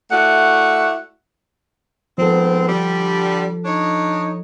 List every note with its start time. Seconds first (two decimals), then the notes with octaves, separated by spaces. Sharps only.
0.11 A3 E4 F#4 D5 F#5
2.18 G#2 F3 B3 C4 A4
2.69 D3 G3
3.65 D4 D#4 C#5